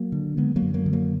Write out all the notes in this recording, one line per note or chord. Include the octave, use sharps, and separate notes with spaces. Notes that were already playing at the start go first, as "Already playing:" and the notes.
Already playing: F#3 A#3
D3
D3 G#3 B3
F#3 A#3
F#2
F#3 A#3
D3
F#3 A#3